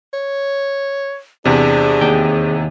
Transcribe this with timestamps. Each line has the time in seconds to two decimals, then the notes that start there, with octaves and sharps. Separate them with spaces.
0.14 C#5
1.45 E2 C3 D4 G#4
2.01 D#2 G5